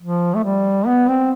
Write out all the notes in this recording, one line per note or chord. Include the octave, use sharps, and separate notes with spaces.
F3
A3
G3
B3
C4